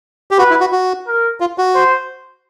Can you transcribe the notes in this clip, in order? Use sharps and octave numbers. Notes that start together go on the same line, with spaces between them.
G4
F#4 B4
E4
F#4
F#4
A#4
F4
F#4
C5